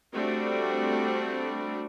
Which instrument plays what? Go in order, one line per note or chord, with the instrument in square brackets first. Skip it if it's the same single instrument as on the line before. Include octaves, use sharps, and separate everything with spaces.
[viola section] G3 A3 C4 D4 F#4